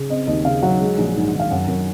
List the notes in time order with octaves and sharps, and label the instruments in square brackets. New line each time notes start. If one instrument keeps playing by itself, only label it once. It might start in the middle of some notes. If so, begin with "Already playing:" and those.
Already playing: [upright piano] C#3
C4 D#5
D#2 D#5
C#3 F5
F#3 F#5
G#3
A#1
G#2
D#3
F5
F#2 F#5
F#2